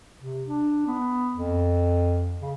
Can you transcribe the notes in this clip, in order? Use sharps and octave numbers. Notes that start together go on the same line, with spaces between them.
C3
D4
B3
F2
C#3